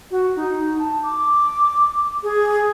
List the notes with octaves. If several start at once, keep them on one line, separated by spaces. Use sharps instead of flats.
F#4
D#4
A5
D6
G#4